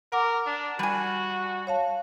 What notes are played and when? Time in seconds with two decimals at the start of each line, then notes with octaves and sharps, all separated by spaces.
0.12 A#4 F#5 D6
0.47 D4
0.79 G3 F#4 G#5
1.67 C#5 F5 A5